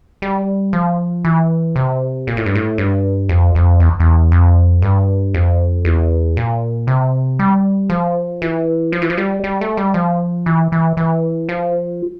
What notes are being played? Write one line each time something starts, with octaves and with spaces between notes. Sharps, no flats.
G3
F3
E3
C3
A#2
A2
G2
A2
G2
F2
F2
E2
E2
F2
G2
F2
E2
A#2
C3
G3
F3
E3
F3
E3
F3
G3
G3
A3
G3
F3
E3
E3
E3
F3